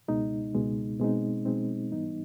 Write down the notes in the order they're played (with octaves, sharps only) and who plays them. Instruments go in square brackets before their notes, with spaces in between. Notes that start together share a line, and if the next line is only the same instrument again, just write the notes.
[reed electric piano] C#2 B2 G#3 D#4
C#2 B2 G#3
B2 G#3 C4 D#4
B2 G#3 C4 D#4
G#2 E3 G3 B3 D#4